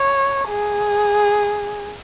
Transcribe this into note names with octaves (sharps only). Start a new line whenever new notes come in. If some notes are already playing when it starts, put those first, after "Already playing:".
Already playing: C#5
G#4